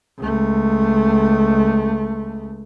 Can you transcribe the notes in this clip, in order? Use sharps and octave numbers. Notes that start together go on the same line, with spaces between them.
C#2 A3